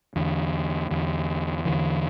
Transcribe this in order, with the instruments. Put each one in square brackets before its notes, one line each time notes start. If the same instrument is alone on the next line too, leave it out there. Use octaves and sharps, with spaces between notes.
[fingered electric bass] E2 D3
E2 D3
E2 D3 E3